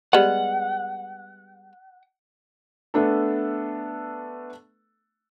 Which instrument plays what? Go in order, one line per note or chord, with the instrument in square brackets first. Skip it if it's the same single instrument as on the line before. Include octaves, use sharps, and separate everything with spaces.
[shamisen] G3 G#3 B3 [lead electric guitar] F#5
[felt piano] A3 B3 D4 A4